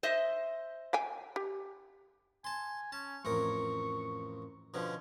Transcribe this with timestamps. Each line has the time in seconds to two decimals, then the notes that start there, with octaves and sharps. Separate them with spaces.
0.03 C5 D#5 E5
0.93 F5 G5 G#5
1.36 G4
2.44 G#5 A5 C6
2.92 C#4 A5
3.25 A1 F2 A#4 C#6
4.74 B2 D3 F3 C#4